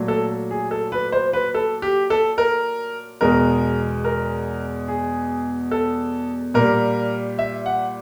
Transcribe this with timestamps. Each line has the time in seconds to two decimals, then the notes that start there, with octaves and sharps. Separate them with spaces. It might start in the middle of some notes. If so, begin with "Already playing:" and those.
Already playing: A#2 F#3 A3
0.08 A4
0.51 G#4
0.71 A4
0.92 B4
1.12 C5
1.33 B4
1.54 A4
1.82 G4
2.10 A4
2.38 A#4
3.21 E2 B2 G#3 A#4
4.05 A#4
4.88 G#4
5.71 A4
6.54 A#2 G3 A#4
7.39 E5
7.66 F#5